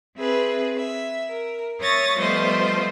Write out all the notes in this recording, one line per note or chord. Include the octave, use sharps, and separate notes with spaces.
C4 G#4 B4 E5
E5
A#4
C#5 E5 C#6 D#6 A6 A#6
F3 G3 A3 B3 C5 D#5